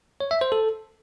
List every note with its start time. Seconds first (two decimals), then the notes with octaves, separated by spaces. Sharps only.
0.20 C#5
0.31 E5
0.41 C5
0.52 A4